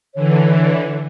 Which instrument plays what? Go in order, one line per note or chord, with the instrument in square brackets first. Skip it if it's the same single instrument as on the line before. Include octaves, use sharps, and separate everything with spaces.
[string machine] D3 E3 [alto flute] C#5